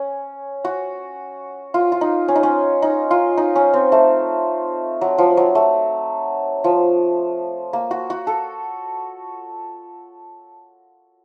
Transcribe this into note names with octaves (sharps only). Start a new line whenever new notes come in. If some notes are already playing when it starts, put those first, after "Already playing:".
Already playing: C#4
F#4
F4
F4
D#4
C#4
D#4
C#4
D#4
F4
D#4
C#4
C4
A3
F#3
F3
F#3
A3
F3
A#3
F#4
F#4
A4